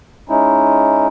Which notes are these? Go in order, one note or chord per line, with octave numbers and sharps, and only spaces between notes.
G#3 C#4 D#4 E4